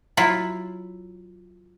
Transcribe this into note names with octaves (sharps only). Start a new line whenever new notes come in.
F#3 E4 F4